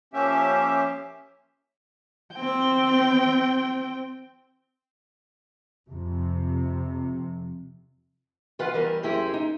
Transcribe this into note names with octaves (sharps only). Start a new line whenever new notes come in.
F3 A#3 C#4 G4 E5
C4 G5
F2 C3
E3 F4 B4 F5 F#5
E2 E3 G3 A#4 D#5
F#2 E4 G4 G#4 C5 A#5
D#4